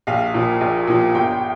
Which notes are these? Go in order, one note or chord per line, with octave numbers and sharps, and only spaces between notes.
A#1 F5
A#2 F3
A#1
A#2 F3
G1 G5